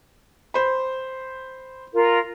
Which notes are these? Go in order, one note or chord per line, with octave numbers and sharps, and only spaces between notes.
C5 B5
F4 A#4